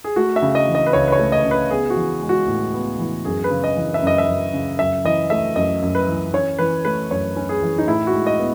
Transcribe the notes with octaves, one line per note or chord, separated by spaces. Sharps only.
G#4
A3 F#4
E5
C#3
D#5
E3
D#5
B4
C#2 C#5
B4
C#5
A3
D#5
C#3
B4
B3 G#4
F#4
E3
G#3
F#4
A2
B3
E3
F#2 G#4
B4
C#3
D#5
E3
E5
F#2 D#5
E5
F#2
C#3
F#2 E5
E3 D#5
A3 E5
F#2 D#5
F#2
B4
E3
C#4 C#5
E3 B4
A3 B4
F#2 C#5
C#4
G#4
E3
D#4
A2 E4
F#4
G#3
D#5
B3